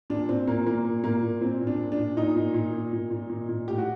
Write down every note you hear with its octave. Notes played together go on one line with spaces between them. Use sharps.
A#2 D4
A#2 C4
A#2 A#3
A#2 A#3
A#2
A#2 A#3
A#2
A#2 C4
A#2
D4
A#2
D4
A#2
A#2 D#4
A#2
A#2
A#2
A#2
A#2
A#2
A#2
A2 G4
F#4